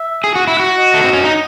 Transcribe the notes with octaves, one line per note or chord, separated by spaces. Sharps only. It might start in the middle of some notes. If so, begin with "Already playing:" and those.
Already playing: E5
G#4
F#4
E4
F#4
D#5
A3
C4
C#4
D#4